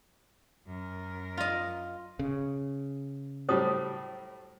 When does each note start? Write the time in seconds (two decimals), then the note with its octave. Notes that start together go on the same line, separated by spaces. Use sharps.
0.67 F#2 A#4
1.37 F4 D#5
2.19 C#3
3.49 A2 F#3 G3 C5 D#6